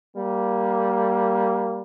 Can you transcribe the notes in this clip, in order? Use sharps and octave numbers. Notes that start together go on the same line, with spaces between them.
G3 A#3